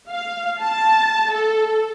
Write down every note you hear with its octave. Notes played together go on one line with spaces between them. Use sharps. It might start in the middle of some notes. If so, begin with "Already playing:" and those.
F5
A5
A4